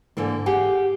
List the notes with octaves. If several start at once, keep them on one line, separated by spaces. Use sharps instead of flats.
G#2 D3 E3 A#3
G4 G#4 F5 F#5 G#5